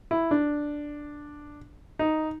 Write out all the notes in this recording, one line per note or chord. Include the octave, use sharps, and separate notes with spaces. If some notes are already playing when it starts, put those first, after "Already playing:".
E4
D4
D#4